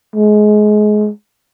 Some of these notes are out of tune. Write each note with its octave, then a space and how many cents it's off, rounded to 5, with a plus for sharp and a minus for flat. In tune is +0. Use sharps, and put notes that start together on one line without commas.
G#3 +25